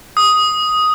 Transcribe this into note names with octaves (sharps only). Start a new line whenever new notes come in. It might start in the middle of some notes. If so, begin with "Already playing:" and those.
D#6